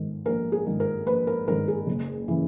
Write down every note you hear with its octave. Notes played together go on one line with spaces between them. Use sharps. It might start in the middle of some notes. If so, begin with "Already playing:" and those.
Already playing: G#2 D#3
A#1 A#4
G#4
G#2 D#3
A#4
A#1 B4
A#4
G#2 D#3 A#4
G#4
F#1
C#3 E3